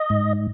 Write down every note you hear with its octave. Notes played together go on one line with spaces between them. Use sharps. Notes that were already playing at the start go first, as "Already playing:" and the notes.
Already playing: D#5
G#2